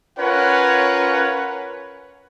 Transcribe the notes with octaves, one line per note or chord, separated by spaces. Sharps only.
C#4 F4 A#4 B4 C#5 F#5